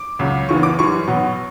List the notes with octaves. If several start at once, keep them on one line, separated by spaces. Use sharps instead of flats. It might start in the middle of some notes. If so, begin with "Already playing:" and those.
Already playing: D6
C#2 C#3 F#3
F#1 E2 C#3 E3 B3 C#6
D6
F#2 E3 G3 C#6
B1 B2 F#3 B3